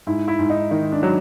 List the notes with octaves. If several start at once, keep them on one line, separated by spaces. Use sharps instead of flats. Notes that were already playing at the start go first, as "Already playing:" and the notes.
G#2 E4
E4
G#2
D#4
D#3 D#4
D4
F#3